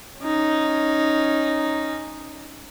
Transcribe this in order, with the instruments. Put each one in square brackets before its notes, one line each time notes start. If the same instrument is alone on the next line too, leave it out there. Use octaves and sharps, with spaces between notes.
[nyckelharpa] C#4 D#4